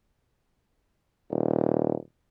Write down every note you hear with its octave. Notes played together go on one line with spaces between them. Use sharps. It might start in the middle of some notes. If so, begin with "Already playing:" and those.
D#1